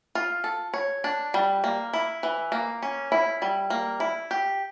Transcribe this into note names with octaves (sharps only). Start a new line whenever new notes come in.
F4
A4
C#5
D4
G3
A#3
E4
E3
A#3
C#4
E4
G3
A#3
E4
G4